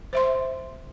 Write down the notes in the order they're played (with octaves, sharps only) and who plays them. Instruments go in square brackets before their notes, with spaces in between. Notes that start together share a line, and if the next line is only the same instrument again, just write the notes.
[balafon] C5 E5 C6